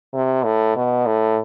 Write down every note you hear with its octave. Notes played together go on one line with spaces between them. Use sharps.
C3
A2
B2
A2